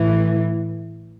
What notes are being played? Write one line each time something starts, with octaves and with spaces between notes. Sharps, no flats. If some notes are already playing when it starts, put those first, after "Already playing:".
Already playing: A2 E3